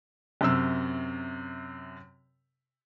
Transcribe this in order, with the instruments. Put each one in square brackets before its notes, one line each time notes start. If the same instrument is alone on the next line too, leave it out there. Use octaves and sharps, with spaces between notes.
[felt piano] F#2 C3 E6